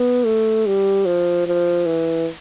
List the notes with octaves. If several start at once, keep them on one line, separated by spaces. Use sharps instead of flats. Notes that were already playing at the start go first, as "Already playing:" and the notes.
Already playing: B3
A3
G3
F3
F3
E3